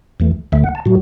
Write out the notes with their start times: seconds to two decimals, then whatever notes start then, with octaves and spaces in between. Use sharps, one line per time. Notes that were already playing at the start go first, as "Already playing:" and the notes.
0.20 E2 E3 A3
0.52 D2 D3 A3 E5
0.64 F#5
0.75 A5
0.85 A2 F#3 F#4